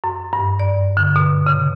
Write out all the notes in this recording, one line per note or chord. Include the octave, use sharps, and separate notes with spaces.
F#2
G2
D5
D3
B2
C#3